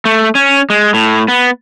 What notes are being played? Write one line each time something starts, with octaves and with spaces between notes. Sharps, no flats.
A3
C#4
G#3
A2
B3